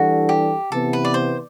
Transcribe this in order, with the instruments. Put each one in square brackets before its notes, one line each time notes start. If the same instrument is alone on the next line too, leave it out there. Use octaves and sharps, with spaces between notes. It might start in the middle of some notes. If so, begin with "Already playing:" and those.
Already playing: [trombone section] E3 G3 D4 A4 [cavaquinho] F#4
[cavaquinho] G4
[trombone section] C3 E3 B3 [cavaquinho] A4
[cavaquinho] B4
D5
C5